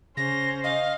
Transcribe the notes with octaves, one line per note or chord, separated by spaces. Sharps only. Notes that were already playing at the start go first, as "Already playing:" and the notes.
C#3 C#4 C5 A#6
D#5 F5